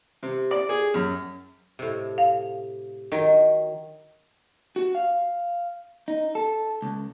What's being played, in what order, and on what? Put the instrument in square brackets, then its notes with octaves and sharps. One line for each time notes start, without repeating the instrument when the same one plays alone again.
[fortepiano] C3
D5
G#4
F#2
[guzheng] A2 C3
[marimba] F5
[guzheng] D#3 F#3
[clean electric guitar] F#4
F5
D#4
A4
C#2